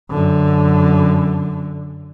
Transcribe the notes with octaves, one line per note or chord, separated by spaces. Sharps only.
F#2 D3